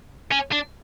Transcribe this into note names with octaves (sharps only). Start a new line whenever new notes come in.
C#4
D4